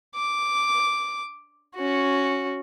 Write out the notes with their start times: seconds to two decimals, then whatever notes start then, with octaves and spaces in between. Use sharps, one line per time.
0.15 D6
1.76 C#4 F#4